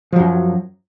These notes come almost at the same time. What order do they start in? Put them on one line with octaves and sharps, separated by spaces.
F3 F#3 F#2